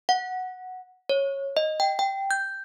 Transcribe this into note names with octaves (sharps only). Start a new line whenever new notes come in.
F#5
C#5
D#5
G5
G5
G6